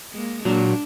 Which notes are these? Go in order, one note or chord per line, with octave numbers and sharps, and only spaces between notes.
G#3 A#3
A#2 F#3 D4